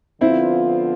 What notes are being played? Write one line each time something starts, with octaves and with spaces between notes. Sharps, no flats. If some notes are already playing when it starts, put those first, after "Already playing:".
D3 F3 B3 C4 E4 F4